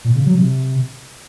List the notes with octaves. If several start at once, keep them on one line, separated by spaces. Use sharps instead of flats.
A#2
C#3
F#3
C3